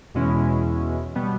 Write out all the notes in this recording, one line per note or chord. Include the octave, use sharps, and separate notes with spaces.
E2 B2 G#3 C#4 E4
B2 G3 B3